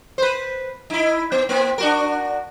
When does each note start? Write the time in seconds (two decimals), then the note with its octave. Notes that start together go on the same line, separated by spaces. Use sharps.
0.18 B4 C5
0.90 D#4 E4
1.32 B3
1.49 A#3 C4
1.78 D4 F#4 A#4